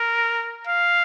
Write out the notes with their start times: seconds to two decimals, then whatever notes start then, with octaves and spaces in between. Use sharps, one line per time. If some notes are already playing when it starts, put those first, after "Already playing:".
Already playing: A#4
0.67 F5